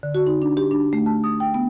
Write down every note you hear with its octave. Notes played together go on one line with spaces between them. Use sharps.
D3
F#4
D#4
D4
G4
D4
A3
A5
D#6
G5
B3